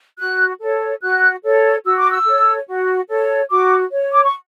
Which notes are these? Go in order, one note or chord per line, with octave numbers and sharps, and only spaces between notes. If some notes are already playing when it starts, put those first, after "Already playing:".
F#4 F#6
A4 C#5
F#4 F#6
A4 C#5
F#4 E6
D6
E6
A4 C#5
F#4
A4 C#5
F#4 D6
C#5
D6
C#6